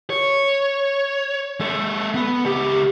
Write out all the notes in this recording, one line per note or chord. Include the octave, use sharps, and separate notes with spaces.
C#5
G#3 A4
B3
C#2 G4